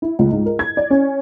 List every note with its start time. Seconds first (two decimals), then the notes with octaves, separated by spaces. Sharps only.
0.02 E4
0.19 C#2
0.31 G#2
0.46 A#4
0.59 G#6
0.77 D5
0.91 C#4